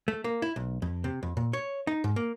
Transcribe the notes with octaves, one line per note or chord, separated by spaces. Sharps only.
A3
A#3
E4
B1
F2
C3
F2
A#2
C#5
D#4
G#2
A#3